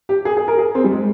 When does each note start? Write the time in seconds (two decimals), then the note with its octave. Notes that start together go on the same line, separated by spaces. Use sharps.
0.09 G4
0.25 G#4
0.37 G#4
0.48 A#4
0.58 G#4
0.75 C4
0.84 G3
0.92 G#3